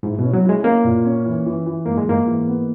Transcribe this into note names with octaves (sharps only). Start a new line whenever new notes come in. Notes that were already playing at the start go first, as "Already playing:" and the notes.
G#2 E4
B2 C#4
F#3
E4
G#3
A#3 C#4
A#2
C#4
E3
E3
E3
G#2 A#3
G#3
G#2 A#3
E3
B3